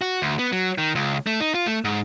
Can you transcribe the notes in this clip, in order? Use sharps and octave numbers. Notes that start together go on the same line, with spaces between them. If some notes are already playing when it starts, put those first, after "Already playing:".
F#4
D2
B3
F#3
D#3
C#2
A3
D#4
F4
A3
G#2